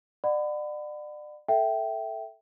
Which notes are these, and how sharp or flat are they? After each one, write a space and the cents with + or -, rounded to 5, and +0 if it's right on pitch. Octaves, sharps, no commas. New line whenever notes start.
D5 +35 F#5 +0 B5 +30
A4 +0 E5 +0 G5 -10